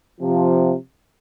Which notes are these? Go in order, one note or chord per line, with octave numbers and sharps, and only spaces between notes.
C3 F3